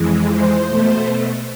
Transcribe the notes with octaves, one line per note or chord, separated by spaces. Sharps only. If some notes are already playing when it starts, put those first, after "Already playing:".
Already playing: F2 E3 G#3
C5
B2 A3